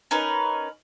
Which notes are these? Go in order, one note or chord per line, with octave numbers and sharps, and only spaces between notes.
C#4 D#4 A#4 B4